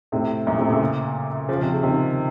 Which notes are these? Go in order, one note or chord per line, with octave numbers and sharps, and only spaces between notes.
A2 C3
F#2 A#2
A2 C3
A#2 C#3
C#3 F3
C3
C#3
C3 D#3